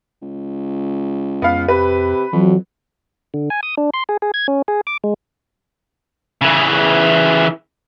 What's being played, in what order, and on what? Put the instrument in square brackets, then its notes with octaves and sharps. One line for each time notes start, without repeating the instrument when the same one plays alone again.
[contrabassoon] C#2
[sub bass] F2 [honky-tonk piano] B3 F5
[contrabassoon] C3 [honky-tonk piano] B4
[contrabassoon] F2 [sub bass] E3 [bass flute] F#3
[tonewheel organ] D3
G#5
D#6
D4
C6
G#4
G#4
G#6
C#4
G#4
D6
G#3
[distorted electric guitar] C#3 E3